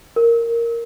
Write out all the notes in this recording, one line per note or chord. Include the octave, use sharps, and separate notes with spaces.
A#4